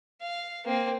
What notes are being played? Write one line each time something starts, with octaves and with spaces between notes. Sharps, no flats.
F5
A#3 C4